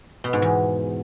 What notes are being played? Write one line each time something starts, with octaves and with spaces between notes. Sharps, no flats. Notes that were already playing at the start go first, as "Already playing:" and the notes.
B2
G#2
E2